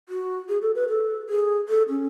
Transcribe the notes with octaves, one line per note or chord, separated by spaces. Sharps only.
F#4
G#4
A4
B4
A4
G#4
A4
C#4